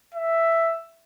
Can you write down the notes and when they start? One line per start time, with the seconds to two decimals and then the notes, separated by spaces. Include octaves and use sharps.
0.14 E5